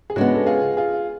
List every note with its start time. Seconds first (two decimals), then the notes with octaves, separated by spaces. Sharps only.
0.10 G#4
0.16 C#3 G#3 B3 D4 F#4
0.35 A4
0.46 F4 G#4
0.77 F4 G#4